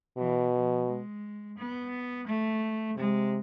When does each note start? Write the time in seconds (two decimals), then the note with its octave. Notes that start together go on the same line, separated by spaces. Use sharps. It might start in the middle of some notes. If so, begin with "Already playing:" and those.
0.17 B2 E3
0.53 F3
0.87 G#3
1.57 B3
2.26 A3
2.96 C3 G#3